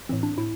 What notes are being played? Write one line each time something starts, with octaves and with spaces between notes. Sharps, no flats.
A2 E3 C4
D4
A2 E4